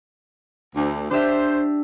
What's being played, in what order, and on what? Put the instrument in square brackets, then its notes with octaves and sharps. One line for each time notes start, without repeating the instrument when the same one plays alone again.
[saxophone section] D2
[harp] D4 G4 E5 [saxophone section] C5